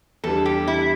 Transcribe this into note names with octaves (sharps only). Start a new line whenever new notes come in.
E2 E3 G3 D4 A4
G4
E4